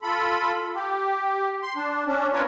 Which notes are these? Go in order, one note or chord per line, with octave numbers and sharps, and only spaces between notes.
F4 A4 B5
G4
C6
D4
C#4 D4
C4 D4 F4 A#4 B4 C#5